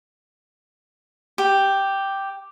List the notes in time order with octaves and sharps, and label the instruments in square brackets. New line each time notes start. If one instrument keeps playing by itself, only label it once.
[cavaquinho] G4